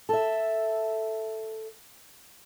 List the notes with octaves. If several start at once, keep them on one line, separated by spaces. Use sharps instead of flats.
A4 E5